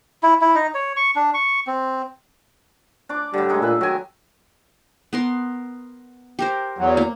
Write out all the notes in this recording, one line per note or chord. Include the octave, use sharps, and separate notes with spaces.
E4
E4
D#4
C#5
C#6
D4
C#6
C4
D4 D5 D6
A2 D3 G3
G#3 D#4 G4
A#2 B4 E5
D#3 F#3 G#5
B3 A#4 C6
G4 A#4 C5
E2 F#3
A#3